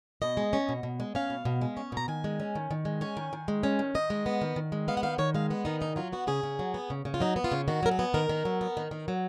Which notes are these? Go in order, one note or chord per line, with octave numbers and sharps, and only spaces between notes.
B2 D#5
G#3
C#4
B2
B2
G#3
C#4 F5
B2
B2
G#3
C#4
B2 A#5
D#3 G#5
G#3
C#4
D#3
D#3
G#3
C#4 G#5
D#3
D#3
G#3
C#4
D#3
D#3 D#5
G#3
B3
D#3
D#3
G#3
B3 F5
F#5
D#3 F5
D#3 C#5
G#3 F5
B3 B4
D#3 D#4
C#3 D#4
F#3 F4
B3 F#4
C#3 G#4
C#3
F#3
B3
C#3
C#3
F4
F#3 D#4
B3
F4
C#3
D#3 F#4
F#3 A#4
G#4
B3
D#3 A#4
D#3
F#3
B3
D#3
D#3
F#3